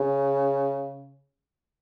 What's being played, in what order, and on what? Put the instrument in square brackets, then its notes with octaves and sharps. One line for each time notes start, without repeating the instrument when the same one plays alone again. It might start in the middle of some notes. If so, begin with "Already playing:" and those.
Already playing: [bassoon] C#3